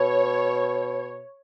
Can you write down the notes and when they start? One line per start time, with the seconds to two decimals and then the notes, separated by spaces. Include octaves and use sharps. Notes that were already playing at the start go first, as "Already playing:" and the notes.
Already playing: B2 C#5